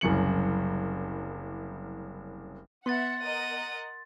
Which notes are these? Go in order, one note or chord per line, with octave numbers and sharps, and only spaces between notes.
F#1 C2 F#2 C#7 F#7
B3 E5 F#5 C6 A6
A#4 D#5 F#5 D#7